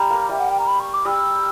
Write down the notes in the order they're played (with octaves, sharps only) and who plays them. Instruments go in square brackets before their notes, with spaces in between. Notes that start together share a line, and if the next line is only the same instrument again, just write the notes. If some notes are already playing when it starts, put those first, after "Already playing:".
Already playing: [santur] G3 [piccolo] A#5
[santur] A#3
[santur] G3 [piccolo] E5
[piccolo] F#5
G5
A#5
B5
C#6
D6
[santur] G3 [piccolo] E6